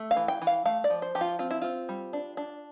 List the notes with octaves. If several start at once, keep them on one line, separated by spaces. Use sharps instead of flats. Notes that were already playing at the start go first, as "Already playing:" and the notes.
Already playing: A3
F5
E3
G5
E3
F5
A3 F5
D5
F3
C5
F3 G4
F4
C4 F4
E4
C4 F4
G3
D4
D4